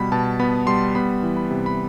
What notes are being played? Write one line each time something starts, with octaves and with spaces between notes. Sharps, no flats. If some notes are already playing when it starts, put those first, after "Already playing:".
Already playing: B2 G3 B3 B5
B2 A5
B3 B5
G3 C6
B3 B5
E3
B5
C3
B5